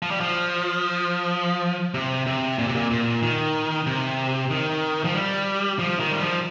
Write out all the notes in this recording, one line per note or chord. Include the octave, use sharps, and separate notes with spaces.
F3
G3
F3
C3
C3
A#2
C3
A#2
A#2
D#3
C3
D#3
F3
G3
F3
D#3
G3
F3